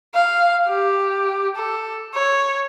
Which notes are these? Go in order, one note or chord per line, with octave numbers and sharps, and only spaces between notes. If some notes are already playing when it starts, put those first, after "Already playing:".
F5
G4
A4
C#5